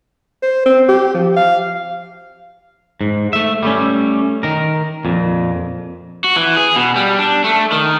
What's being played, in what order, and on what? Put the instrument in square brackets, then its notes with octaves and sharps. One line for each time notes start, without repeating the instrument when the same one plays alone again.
[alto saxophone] C5
C4
G4
F3
F5
[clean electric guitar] G#2
A3 E5
G3 A3 C#4
D#3 A#4
F2 A#2
[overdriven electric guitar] F#4
E3
G#4
B2
G3
D4
A3
D#3